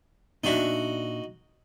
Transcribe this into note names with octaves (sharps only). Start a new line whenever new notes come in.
A#2 D4 D#4 F#4 E5